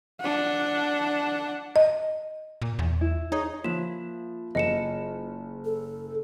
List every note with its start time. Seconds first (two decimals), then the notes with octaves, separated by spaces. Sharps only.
0.20 D4 F#5
1.76 D#5
2.62 A#2
2.79 E2
3.01 E4
3.32 D#4 G#4 C#5 A#5
3.64 F3 A#3 F4 E7
4.55 F#1 D#5 C#7 E7
5.65 A4